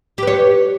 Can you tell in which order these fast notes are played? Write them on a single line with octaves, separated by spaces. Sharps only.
G4 B4 C#5